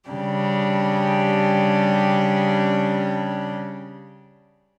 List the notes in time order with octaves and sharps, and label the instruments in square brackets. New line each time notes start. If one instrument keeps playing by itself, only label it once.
[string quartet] C#3 G3 D4 G4